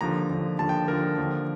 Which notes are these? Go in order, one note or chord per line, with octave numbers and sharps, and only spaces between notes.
D#2 D3 F3 A#5
D#2 D3 F3
D#2 D3 F3 A5
G5
D#2 D3 F3 A#4
D#2 D3 F3